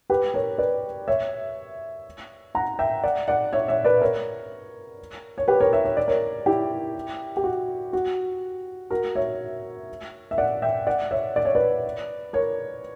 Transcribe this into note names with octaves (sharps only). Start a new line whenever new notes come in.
G4 B4
A#4 C#5
B4 D5
C#5 E5
F#5 A#5
E5 G5
D5 F#5
D5 F#5
C#5 E5
C#5 E5
B4 D5
A#4 C#5
C#5
G4 B4
A#4 C#5
C#5 E5
C#5
D5
A#4 C#5
E4 G4
G4
F#4
F#4
F#4 A#4
C#5 E5
E5
D5 F#5
E5 G5
D5 F#5
C#5 E5
D5
C#5
B4 D5
A#4 C#5